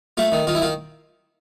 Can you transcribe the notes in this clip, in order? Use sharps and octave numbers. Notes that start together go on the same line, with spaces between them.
A3 F4
D#3
D#3 F4
E4
D#3 F4